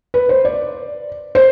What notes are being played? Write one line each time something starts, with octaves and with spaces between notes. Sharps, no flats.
B4
C5
D5
C5